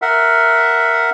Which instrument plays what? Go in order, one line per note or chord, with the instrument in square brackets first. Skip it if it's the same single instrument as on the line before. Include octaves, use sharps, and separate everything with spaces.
[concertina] A#4 E5 F#5